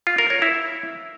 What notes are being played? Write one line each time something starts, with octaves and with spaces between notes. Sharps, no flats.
F4
A#4
C#5
E4